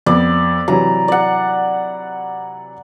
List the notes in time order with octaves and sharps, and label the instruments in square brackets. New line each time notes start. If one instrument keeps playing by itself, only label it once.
[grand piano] F2 B3 [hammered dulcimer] D5
[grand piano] C3 E3 F#3 [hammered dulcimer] A#5
[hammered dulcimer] D5 F#5